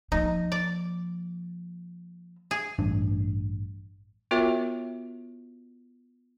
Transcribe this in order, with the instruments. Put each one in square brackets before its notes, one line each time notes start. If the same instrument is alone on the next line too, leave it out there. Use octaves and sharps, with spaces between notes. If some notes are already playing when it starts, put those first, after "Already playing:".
[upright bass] F3 A#3 [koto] D#4
[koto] D5
G#4
[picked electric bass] A1 G2 D4
[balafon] B3 F4 F#4 A#4 C#5 E5